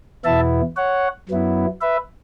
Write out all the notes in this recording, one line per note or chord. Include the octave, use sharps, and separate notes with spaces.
E2 B2 B3 E4 E5 A5
C#5 F#5
F#2 F#3 B3 E4
B4 E5